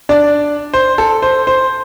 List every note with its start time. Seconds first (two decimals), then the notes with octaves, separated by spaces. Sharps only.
0.09 D4 D5
0.73 C5
0.98 A4
1.22 C5
1.47 C5